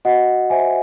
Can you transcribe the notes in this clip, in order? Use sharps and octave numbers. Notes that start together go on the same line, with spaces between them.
F#4 D#5 F#5
C5 E5 G#5